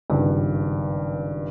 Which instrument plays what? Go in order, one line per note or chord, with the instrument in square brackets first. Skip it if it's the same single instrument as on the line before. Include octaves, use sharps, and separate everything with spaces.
[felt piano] G#1 C#2 G2